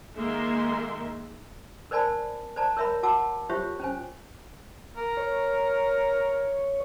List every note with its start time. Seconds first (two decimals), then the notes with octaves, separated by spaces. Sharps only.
0.16 D#3 G#3 A#3 A#4 E5 C6
1.91 A#4 C5 D5 G#5 A5 B5
2.56 C5 D5 A5 A#5
2.77 A#4 C#5 E5 A#5 B5
3.03 F#4 F#5 A5 D6 E6
3.50 F4 G4 C5 C#5 E5
3.80 C#4 C5 G#5
4.97 A#4
5.17 C#5